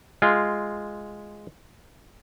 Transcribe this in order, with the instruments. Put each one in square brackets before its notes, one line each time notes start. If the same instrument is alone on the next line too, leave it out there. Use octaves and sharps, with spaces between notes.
[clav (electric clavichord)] G#3 F4